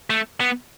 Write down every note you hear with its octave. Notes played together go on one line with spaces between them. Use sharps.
A3
B3